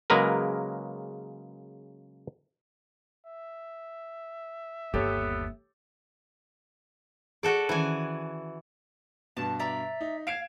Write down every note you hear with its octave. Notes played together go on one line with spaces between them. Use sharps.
C#3 F#3 G#3 A#3 A#4 B4
E5
G1 D#2 B3 G4 A4 C#5
F#4 G#4 A4 D5
D#3 E3 C#4 G#5
G2 B2 A5
D5 E5 A#5
D#4
F5 G#6 D7 E7